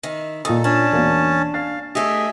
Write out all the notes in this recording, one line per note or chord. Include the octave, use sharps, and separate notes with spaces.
D#3 E4
A#2 D#3 A4 D#6
C#4 D4 A5
E1 B2 A#3
F5 A6
A3 G4 G#4 D#5 E5